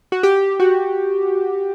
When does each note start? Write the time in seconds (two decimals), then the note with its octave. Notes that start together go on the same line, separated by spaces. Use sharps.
0.12 F#4
0.23 G4
0.60 F#4